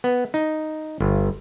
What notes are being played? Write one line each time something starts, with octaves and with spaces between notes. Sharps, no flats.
B3
D#4
G1